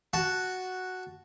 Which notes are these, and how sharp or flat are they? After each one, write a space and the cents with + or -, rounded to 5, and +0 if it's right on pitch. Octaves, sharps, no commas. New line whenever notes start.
F#4 +0 A5 -5